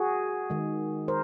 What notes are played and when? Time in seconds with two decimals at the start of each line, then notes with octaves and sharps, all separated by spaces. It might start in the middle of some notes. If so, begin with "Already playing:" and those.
Already playing: F#4 G#4
0.50 D#3 G#3
1.08 A#4 C5